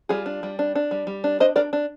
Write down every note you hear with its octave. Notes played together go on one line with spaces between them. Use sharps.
G3 F4 G#4
D4
G3
D4
D4
G3
G3
D4
D4 C5 D#5
D4 A#4 D5
D4